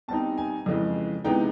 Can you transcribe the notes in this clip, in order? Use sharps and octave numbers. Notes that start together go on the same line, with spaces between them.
B2 G3 C4 D#4 A5
G#5
F2 C#3 E3 G#3
C3 E3 G#3 B3 D#4 G5